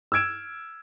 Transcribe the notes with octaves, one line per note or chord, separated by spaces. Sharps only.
E6 F6 G#6 D7 E7